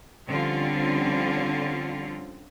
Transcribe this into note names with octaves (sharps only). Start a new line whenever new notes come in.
D3 F3 G3 C4 C#4 F4